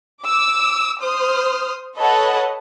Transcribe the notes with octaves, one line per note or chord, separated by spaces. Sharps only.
D6 E6
C5 D#6 F6
A4 B4 C#5 D#5 F#5 A5